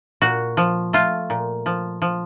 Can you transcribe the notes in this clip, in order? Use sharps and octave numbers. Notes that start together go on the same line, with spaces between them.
A#2 F#4
F3
A3 F4
A#2
F3
F3